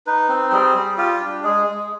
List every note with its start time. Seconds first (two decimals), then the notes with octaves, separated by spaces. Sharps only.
0.07 D#4 B4
0.29 C4
0.52 G3 G#4
0.75 G3
0.98 F4 G4
1.20 D4
1.44 G#3 G#4
1.67 G#3